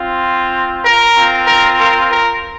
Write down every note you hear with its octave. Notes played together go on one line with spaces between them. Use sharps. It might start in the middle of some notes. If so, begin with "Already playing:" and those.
Already playing: C4 F4
A#4
C4 F4
A#4
A#4
A#4